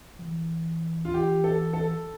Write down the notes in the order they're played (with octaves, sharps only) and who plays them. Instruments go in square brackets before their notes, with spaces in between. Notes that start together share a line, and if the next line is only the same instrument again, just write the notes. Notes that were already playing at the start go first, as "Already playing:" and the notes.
[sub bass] F3
E3
[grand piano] F4
[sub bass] E3 [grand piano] G4
[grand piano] A4
A4